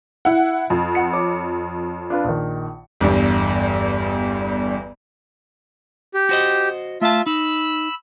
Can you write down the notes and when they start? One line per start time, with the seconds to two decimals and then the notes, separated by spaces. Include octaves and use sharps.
0.25 E4 F#5
0.70 F2
0.95 F#5 C#7
1.13 C#5 D6
2.10 D4 F4 B4
2.24 A#1 D#3
3.01 G1 E2 G2
6.14 G4
6.29 F#4 C5 D#5
7.02 A3 F4 E5 A5
7.26 D#4 B5 E6